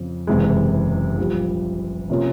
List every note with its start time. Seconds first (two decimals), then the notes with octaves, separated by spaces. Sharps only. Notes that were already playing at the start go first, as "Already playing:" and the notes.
Already playing: F2 C#3
0.27 F#1 E2 C3 E3 G#3
1.18 A#1 A#2 G3
2.10 C3 F3 A#3 C#4 F4